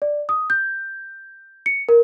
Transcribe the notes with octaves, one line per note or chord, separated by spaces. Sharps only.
D5
D#6
G6
C#7
A#4